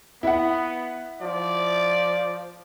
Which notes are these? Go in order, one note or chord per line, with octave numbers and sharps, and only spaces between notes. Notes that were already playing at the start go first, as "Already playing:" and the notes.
B3 E4 F#5
F3 D5